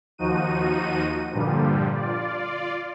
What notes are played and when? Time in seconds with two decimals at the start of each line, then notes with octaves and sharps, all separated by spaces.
0.18 D#2 F3 D#4 F#4 D#7
1.32 G2 A#2 D3 F3 G3
1.94 F4 D5